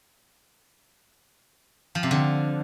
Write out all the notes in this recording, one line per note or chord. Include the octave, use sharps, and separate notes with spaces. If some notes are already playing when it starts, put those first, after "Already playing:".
F3
C3
D3